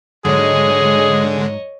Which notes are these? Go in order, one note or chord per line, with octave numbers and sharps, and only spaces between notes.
G#2 D3 F#3 G#3 G#4 C#5 D#5